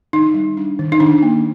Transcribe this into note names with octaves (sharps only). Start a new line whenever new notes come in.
D#3 D#4
G3
D4
D#3
D#4
D#3 D4
A#3